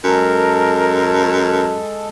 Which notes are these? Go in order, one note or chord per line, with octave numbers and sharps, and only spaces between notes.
F#2 G#3 A4 A#4